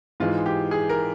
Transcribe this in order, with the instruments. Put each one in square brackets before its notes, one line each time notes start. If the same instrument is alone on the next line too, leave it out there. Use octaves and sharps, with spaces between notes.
[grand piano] G#2 E3 G#3 [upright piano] F4
[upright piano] G4
G#4
A#4